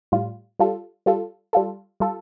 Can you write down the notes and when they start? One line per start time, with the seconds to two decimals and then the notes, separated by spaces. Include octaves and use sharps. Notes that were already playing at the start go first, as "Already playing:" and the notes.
0.12 A2 G3 F4
0.59 G3 F4 A4
1.06 G3 F4 A4
1.53 G3 F4 A4
2.00 G3 F4 A4